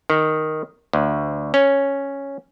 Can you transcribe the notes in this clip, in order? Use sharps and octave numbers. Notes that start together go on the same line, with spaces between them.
D#3
D2
C#4